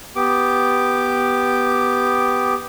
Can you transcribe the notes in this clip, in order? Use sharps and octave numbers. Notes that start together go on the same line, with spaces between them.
B3 G4 D6